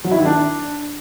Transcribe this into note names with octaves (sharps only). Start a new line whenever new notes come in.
F#3
E4
D#3
D4